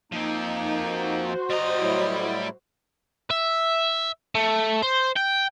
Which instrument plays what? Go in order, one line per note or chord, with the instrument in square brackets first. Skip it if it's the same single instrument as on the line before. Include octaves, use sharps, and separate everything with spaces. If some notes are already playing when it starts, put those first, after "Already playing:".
[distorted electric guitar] F3 C4 [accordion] A#3 D#4
[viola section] F#4 C5
[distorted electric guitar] G3 A#5 [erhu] D#5
[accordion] A2 F#3 E4
[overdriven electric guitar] E5
A3
C5
G5